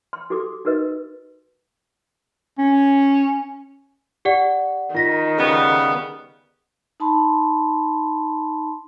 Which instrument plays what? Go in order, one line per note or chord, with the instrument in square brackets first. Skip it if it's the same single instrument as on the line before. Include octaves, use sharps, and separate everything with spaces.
[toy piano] C6
F#4 G4 A4 D6
D#4 F#4 A#4 B4 D#5
[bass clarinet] C#4
[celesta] G4 D5 F#5
[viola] D#3 [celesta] F4 A#6 B6
[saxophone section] C#3 G3 B3
[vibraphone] D#4 A5 B5 C6